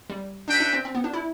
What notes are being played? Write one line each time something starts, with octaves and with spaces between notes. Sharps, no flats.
G3
D4 F#4 B4 E5 G5
D4
C4
C4
B3
D4
E4